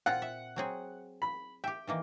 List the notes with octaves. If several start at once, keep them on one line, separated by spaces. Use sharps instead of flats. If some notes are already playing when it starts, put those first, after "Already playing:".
A#2 C4 F4 F#5
E5
F#3 C4 G#4
B5
G4 E5 G5
D#3 E3 A#3